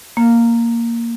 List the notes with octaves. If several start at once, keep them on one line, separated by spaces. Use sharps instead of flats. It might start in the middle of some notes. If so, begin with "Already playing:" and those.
A#3